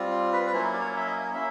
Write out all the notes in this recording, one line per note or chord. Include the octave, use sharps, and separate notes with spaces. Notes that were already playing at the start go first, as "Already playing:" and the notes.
Already playing: G3 C4 F4
B4
B4
F#3 A#3 C#4 E4 C5
D5
C#5
E5
D#5
A#3 C#4 E5